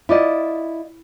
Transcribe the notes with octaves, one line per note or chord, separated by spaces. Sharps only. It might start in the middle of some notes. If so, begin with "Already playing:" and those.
E4 F4 D5 D#5